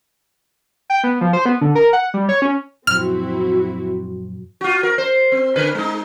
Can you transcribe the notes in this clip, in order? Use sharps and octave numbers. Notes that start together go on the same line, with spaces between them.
G5
B3
F3
C5
B3
D3
A#4
F#5
G3
C#5
C#4
F#2 A#2 F3 C4 E4 F#4 F6
F4 F#4
A#4
C5
C4
D3 A#4 B4
G#3 D#4